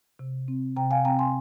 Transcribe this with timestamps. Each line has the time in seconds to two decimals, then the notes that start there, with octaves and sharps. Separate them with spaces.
0.19 C3
0.48 C4
0.76 C3 G5 A#5
0.91 F5 G#5
1.05 C4 G5 A#5
1.19 G#5 C6